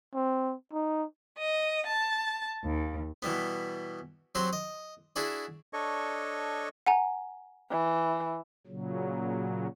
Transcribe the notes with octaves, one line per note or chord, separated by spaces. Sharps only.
C4
D#4
D#5
A5
D#2
B2 E3 G3 B3
F#3 C4 F#4 G4 C5
D#5
D4 E4 F#4 G#4 D5
D4 A4 C#5 D#5 C#6
F#5 G#5 A#5
E3
A#2 C#3 F#3